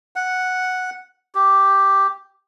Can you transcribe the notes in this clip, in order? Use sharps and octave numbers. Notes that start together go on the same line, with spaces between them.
F#5
G4